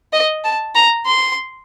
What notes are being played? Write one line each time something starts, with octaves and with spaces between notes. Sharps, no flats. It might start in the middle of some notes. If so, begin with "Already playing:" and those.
D#5
A5
A#5
C6